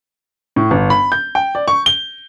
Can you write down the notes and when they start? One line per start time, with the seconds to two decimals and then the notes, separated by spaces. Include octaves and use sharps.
0.56 A2
0.71 G1
0.90 B5
1.12 G6
1.35 G5
1.55 D5
1.68 C#6
1.86 G7